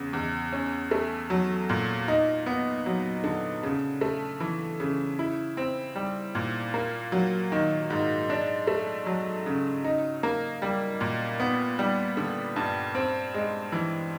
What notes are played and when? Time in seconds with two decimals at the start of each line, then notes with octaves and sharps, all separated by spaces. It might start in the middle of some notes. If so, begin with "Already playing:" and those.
Already playing: E2 C#3
0.13 E2
0.52 C#4
0.91 A3
1.30 F#3
1.70 A#2
2.08 D#4
2.46 B3
2.86 F#3
3.24 D3
3.63 C#3
4.01 A3
4.40 E3
4.80 C#3
5.19 E4
5.57 C4
5.96 G3
6.35 A#2
6.74 A#3
7.12 F#3
7.52 D#3
7.90 G#2
8.30 D4
8.67 A3
9.06 F#3
9.46 C#3
9.84 D#4
10.23 A#3
10.62 G3
11.01 A#2
11.40 B3
11.79 G3
12.17 D3
12.56 G2
12.95 C4
13.34 G#3
13.72 E3